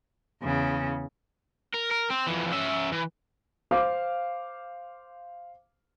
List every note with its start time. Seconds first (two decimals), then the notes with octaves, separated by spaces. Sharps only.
0.42 E2 C#3
1.74 A#4
1.91 A#4
2.10 C4
2.26 F2 E3
2.52 C#4 E5
2.92 E3
3.71 C5 F5 D6